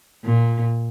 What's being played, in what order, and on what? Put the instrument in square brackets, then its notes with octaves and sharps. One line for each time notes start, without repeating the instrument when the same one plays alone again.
[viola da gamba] A#2